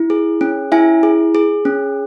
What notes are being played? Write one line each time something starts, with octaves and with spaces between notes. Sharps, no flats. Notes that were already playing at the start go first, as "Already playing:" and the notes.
Already playing: E4
G#4
C#4
E4 E5 G#5
G#4
G#4
C#4